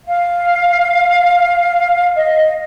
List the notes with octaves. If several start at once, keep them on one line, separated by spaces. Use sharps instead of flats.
F5
D#5